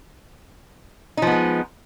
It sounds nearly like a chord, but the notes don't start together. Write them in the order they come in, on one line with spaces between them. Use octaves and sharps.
D#4 F3 B3 G#3